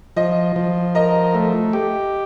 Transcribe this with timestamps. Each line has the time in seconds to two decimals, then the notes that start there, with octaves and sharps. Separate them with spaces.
0.17 F3 D#5
0.56 F3
0.95 A#4 D#5
1.34 A3
1.73 G4